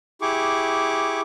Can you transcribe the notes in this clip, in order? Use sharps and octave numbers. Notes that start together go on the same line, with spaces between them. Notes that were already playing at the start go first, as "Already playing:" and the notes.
E4 G4 G#4 C#6 D6